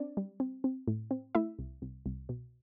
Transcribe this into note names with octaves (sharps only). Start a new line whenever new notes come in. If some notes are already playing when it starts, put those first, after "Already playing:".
Already playing: C4 D4 D5
G3
C4
C4
A2
C4
A3 E4 E5
C2
C2
C2
B2